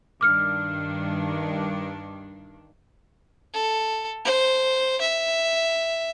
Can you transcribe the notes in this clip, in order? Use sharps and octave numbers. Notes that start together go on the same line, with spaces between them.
G2 D#3 D4 D6 F6 C#7
A4
C5
E5